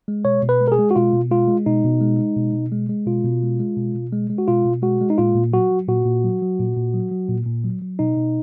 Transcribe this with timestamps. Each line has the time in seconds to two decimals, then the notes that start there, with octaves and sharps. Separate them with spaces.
0.08 G#3
0.25 B2 C#5
0.43 B2
0.49 B4
0.61 G#3
0.68 A#4
0.72 G#4
0.79 G#3
0.91 F#4
0.96 B2 F4
1.13 B2
1.31 G#3 F4
1.48 G#3
1.66 B2 D#4
1.84 B2
2.01 G#3
2.19 G#3
2.37 B2
2.53 B2
2.72 G#3
2.89 G#3
3.06 B2 F4
3.24 B2
3.43 G#3
3.59 G#3
3.77 B2
3.94 B2
4.12 G#3
4.30 G#3
4.38 F#4
4.48 B2 F4
4.66 B2
4.82 G#3 F#4
5.01 G#3
5.10 D#4
5.18 A#2 F4
5.35 A#2
5.53 F#3 F#4
5.71 F#3
5.88 A#2 F#4
6.05 A#2
6.24 F#3
6.42 F#3
6.59 A#2
6.76 A#2
6.94 F#3
7.11 F#3
7.29 A#2
7.46 A#2
7.64 F#3
7.82 F#3
7.99 B2 D#4
8.17 B2